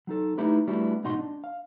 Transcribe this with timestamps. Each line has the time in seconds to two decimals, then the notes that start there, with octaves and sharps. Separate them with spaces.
0.07 F#3 D#4 A4
0.38 A3 D#4 E4 G4 B4
0.67 G3 A3 B3 D4 E4 F#4
1.03 G#2 B2 D#4 F#4 C6
1.19 D4
1.44 F5